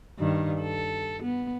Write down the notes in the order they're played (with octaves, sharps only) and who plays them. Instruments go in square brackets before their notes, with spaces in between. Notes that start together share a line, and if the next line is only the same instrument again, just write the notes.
[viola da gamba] G2 D#3
A4
B3